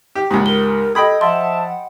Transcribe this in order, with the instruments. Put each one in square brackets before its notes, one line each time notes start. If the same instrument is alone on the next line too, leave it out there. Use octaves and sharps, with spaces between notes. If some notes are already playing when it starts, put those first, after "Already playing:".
[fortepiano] G4
[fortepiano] C#2 G#2 [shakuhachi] A#3 [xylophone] G4
[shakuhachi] A#4 [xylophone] G7
[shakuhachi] A4 [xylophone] D#5 G#6 [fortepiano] G5 B5 D#6
[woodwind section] F3 E5 A5 [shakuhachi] F#5 [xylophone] C6